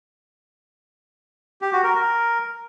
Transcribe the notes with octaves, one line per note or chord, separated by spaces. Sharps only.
G4
F#4
A#4
A#4